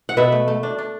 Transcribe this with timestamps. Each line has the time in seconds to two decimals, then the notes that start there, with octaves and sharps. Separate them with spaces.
0.09 F#5
0.17 B2 B4 E5
0.32 A3
0.48 A3
0.63 D4
0.78 D4